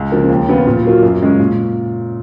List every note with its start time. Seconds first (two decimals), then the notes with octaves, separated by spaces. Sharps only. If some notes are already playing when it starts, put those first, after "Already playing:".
Already playing: C#2
0.12 C#3 F3 A#3
0.30 D#2
0.48 C#3 F3 B3 F4
0.67 A#2
0.84 F#3 A#3 F4
1.03 F#2
1.21 C#3 G#3 C#4
1.40 A#2